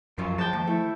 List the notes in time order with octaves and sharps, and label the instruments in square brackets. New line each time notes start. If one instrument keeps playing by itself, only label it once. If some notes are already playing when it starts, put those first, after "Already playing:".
[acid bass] F#2 [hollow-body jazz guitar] F3 F#3 F4
[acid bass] F3 [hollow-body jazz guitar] G#3 [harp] G5 A5
[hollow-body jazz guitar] D#2 [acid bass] F3
[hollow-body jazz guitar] A3 [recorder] E4